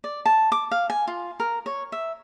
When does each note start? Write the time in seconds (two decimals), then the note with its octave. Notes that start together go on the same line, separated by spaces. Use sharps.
0.04 D5
0.26 A5
0.52 D6
0.71 F5
0.90 G#5
1.08 F4
1.40 A#4
1.66 C#5
1.92 E5